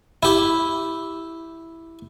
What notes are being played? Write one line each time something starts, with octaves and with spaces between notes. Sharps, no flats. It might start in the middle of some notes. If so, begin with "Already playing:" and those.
E4 G4